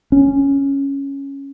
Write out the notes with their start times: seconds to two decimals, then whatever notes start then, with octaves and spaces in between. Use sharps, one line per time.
0.12 C#4